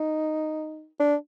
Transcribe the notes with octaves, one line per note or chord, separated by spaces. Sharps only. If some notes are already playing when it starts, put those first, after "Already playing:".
Already playing: D#4
D4